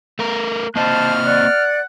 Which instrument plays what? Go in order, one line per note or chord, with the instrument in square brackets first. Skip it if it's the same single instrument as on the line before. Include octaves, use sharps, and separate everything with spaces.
[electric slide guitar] A3 A#4
[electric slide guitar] A#3 C4 D#5 [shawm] C5 [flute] A5 [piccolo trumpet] F6
[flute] D5 [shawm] F#5